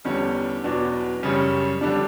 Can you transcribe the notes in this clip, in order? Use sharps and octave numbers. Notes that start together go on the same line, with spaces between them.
E2 D3 G3 C#4
E2 B2 F#3 B3 D4
F#2 C#3 G3 C#4
D3 G3 D4